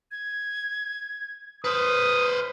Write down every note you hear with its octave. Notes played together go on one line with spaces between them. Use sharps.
G#6
B4 C5 D#6 F6